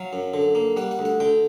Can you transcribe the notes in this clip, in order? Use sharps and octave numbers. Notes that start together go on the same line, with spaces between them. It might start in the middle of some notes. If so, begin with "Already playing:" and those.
Already playing: F#3 F5
F#2
D3
A#3
G3 F#5
F#5
D2
F#5
D3 G5